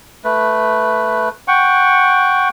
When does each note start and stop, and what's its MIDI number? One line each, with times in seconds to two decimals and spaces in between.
0.25 1.29 57
0.25 1.29 71
1.48 2.49 78
1.48 2.49 79
1.48 2.49 85